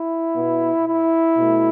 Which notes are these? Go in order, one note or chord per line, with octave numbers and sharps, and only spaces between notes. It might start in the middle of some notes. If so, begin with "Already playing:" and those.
Already playing: E4
B2 B3
E4
B2 A3